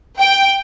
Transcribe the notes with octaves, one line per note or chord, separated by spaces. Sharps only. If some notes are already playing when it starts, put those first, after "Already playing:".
G5